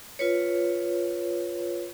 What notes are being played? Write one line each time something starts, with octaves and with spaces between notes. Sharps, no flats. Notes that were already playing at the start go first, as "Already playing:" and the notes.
F4 B4 C#5